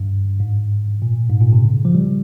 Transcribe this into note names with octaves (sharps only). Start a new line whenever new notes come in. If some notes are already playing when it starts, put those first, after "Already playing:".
Already playing: G2
G#2
A#2
G#2
A#2
C3
C#3
F3
G3